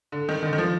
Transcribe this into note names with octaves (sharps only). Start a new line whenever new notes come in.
D3
D#3
D#3
D3
D#3
F3